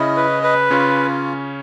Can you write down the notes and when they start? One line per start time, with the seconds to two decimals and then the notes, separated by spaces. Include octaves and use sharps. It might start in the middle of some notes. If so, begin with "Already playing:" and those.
Already playing: C#3 C#4 E4 D#5
0.16 B4
0.43 B4
0.70 C#3 C#4 F4